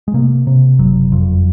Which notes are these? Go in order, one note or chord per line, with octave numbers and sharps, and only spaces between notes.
G#3
C3 A#3
C3
F#1 F#3
F2